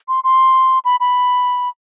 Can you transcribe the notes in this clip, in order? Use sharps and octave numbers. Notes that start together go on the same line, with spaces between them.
C6
C6
B5
B5